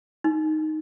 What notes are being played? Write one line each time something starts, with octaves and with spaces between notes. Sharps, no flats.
D#4